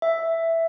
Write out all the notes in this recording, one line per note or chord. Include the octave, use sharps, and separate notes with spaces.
E5